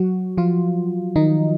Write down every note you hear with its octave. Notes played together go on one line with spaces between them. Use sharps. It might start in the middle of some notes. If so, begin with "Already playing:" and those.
Already playing: F#3 F#4
F3 F4
D#3 D#4